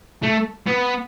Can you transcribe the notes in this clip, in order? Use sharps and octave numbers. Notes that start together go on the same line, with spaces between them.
A3
B3